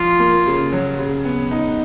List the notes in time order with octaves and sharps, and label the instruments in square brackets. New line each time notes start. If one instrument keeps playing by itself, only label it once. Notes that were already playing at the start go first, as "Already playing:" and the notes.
Already playing: [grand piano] F3 [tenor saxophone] F4
[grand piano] A#3
C#3
F#3
C#3
B3
D#4